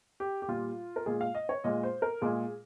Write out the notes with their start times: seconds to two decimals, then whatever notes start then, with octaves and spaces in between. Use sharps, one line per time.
0.20 G4
0.42 G4
0.48 A#2 G3 F4
0.96 A#4
1.06 A#2 G#3 G#4
1.21 F5
1.35 D#5
1.49 C#5
1.64 A#2 G#3 D#5
1.83 C5
2.02 A#4
2.22 A#2 G#3 G#4